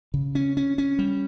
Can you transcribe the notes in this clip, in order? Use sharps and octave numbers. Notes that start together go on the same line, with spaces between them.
C#3
C#4
C#4
C#4
G3